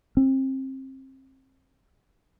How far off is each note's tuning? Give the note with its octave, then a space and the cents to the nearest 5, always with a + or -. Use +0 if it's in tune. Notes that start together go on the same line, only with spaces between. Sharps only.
C4 +30